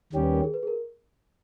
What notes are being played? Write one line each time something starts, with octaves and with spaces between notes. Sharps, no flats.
D#2 D#3 G3 C#4 G4
B4
A#4
G#4
B4
G#4
A#4